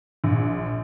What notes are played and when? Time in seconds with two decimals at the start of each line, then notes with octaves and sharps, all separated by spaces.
0.24 A#1